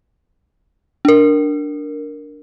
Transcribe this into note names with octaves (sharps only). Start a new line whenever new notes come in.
D4 A#4